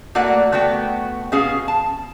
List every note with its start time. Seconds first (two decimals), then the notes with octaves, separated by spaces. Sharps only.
0.15 A3 A#3 F#4 D5 F#5
0.52 A3 B3 F#4 G5
1.32 B2 C#4 G#4 F5
1.68 A5